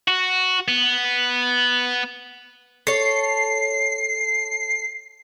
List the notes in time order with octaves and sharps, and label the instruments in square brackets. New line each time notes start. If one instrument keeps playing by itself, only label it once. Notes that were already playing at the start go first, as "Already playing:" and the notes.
[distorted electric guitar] F#4
B3
[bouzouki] A4 C#5 [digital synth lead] C7